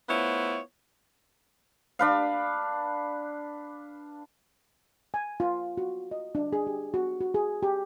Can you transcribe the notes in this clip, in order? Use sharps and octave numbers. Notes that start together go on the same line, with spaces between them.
A3 B3 E4 F4 C5 C#5
D4 B4 F5
G#5
F4
F#4
D#5
D4
G#4
G4
F#4
F#4
G#4
G4